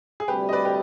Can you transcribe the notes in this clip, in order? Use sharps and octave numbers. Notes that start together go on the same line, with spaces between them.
G#4
D2 C3 G3 G4 B4
D#5
B4 D5
G4 B4